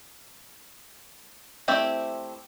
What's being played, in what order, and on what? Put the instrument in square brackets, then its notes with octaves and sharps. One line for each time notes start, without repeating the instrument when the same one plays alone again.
[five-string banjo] A3 C4 E4 G4 D5